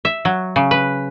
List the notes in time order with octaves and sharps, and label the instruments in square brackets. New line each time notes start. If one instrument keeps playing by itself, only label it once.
[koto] E5
F#3
C#3
B4